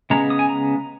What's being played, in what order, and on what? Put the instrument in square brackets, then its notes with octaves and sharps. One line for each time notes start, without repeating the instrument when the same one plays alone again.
[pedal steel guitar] C#3 G#3 B3 A#5
D#6
G#5
A#5